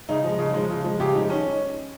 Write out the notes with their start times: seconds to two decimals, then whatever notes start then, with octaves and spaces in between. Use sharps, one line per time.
0.09 C#3 D#4
0.24 F3 G#3
0.39 C#3
0.54 F3 G#3
0.70 C#3
0.84 F3 G#3
1.00 C#3 G4
1.15 F3 G#3 D#4
1.30 D#3 C#4